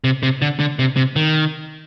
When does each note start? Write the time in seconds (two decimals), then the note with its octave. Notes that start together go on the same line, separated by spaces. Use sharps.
0.04 C3
0.23 C3
0.42 D3
0.60 D3
0.79 C3
0.96 C3
1.16 D#3